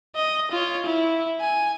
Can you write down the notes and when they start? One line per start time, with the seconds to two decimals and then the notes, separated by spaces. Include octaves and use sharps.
0.16 D#5
0.51 F4 C#5
0.86 E4
1.41 G#5